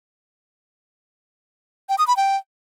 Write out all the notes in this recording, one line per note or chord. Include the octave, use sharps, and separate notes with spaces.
G5
D#6
B5
G5